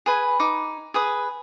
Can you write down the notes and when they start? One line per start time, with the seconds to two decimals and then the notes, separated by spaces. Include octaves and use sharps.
0.06 G#4 B4 G#5 B5
0.40 D#4 D6
0.94 G#4 B4 D#6